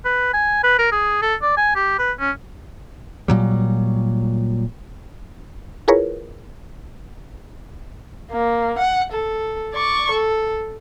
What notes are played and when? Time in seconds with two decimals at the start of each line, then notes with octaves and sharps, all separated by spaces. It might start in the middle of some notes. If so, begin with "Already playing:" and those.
0.05 B4
0.34 G#5
0.64 B4
0.78 A#4
0.92 G#4
1.22 A4
1.42 D5
1.57 G#5
1.76 G4
1.99 B4
2.20 C#4
3.28 A#2 F#3 G3
5.88 E4 F4 G#4 A#4 B4 C#5
8.31 A#3
8.78 F#5
9.12 A4
9.74 D5 C#6
10.11 A4